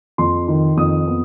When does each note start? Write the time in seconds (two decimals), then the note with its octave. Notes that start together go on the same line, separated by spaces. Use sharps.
0.18 F2 C6
0.48 D#3
0.77 F2 D#6
1.07 B3